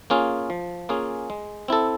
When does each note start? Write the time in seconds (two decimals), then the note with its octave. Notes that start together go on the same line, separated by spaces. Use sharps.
0.10 A#3 C#4 F4 G#4
0.50 F3
0.89 A#3 C#4 F4 G#4
1.30 G#3
1.68 C4 E4 A4